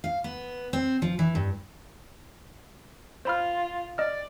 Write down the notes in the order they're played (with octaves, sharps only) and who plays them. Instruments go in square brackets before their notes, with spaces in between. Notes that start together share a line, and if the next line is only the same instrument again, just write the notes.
[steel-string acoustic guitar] F5
B3
C4
F3
E3
G2
[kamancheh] F4 [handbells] C5 B5 F6
[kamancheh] D5 [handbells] D#5 F6